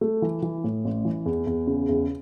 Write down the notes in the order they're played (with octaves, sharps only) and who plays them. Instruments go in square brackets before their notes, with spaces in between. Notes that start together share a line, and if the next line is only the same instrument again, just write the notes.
[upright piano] A3
E3
E3
A2
A1
E3
E2
E2
C#3
E2